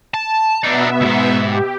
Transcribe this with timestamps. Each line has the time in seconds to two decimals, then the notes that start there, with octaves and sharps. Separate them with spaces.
0.14 A5
0.64 B2 B3 D4 D#4 E5
1.01 C#2 G#2
1.43 G4